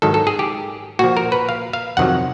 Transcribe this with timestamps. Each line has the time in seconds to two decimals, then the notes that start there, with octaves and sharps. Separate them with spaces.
0.02 G#2 D#3 F#3 A4
0.14 A4
0.27 G#4
0.39 G4
0.99 A#2 F3 F#4
1.17 A#4
1.32 B4
1.49 F5
1.73 F5
1.97 F2 C3 D#3 F#3 F#5